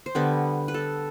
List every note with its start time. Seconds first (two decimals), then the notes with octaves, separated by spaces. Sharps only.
0.06 C5
0.15 D3 G3 B3 B4
0.68 B4
0.74 A4